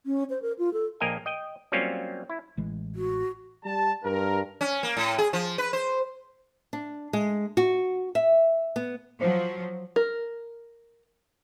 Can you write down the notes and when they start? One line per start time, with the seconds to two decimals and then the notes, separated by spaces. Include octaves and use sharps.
0.06 C#4
0.30 C5
0.42 A#4
0.59 F4
0.73 A4
1.00 A#1 A#3 A#4 D#5 G5 G#5
1.26 D#5 G5
1.72 F#3 G3 A#3 C4 C#4 F4
2.30 E4
2.57 A1 E3 G#3
2.95 F#4
3.64 G3 A5
4.04 G2 A#4
4.61 C#4
4.83 A#3
4.97 A2
5.18 G#4
5.33 F3
5.58 B4
5.73 C5
6.73 D4
7.13 G#3
7.57 F#4
8.15 E5
8.76 B3
9.21 F3 F#3 C5
9.96 A#4